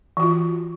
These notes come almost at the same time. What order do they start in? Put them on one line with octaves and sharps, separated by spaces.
E3 F#4 F4